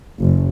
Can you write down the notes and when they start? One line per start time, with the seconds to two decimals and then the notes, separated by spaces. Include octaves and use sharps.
0.19 F#1